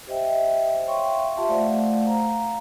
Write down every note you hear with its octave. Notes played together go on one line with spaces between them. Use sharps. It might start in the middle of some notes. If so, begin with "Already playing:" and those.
G4 C5 D#5 E5 G5
C#5 E5 F5 G5 C6 C#6
F4 G4 E5 A5 C6
A3 C5 D5 F5 F#5
F5 A#5